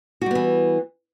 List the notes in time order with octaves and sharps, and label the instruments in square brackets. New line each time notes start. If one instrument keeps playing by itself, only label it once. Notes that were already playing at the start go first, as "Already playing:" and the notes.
[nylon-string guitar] F#4
G3
B3
E3